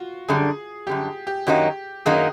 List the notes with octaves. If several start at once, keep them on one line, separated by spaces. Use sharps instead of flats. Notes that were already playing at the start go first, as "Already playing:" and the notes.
Already playing: F4 F#4
F#2 D3 G3 G#4
F#2 D3 G3 G4
G4
F#2 D#3 F#3 A#3 D#4 G4
F#2 D#3 F#3 A#3 D#4 G#4